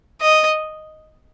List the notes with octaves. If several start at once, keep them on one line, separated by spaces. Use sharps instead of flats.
D#5